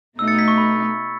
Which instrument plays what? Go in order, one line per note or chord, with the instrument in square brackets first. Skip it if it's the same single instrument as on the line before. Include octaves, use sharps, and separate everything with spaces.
[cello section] B2 A3 D#4 [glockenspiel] E6
[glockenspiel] A6 C#7
G#6 B6
C#6
B5